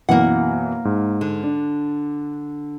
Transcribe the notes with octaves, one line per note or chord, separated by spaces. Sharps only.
F#2 B2 E3 A#3 F#5
G#2
D3
D4